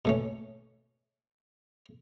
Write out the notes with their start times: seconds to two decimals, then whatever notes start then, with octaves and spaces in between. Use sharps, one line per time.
0.05 B2 A3 C#4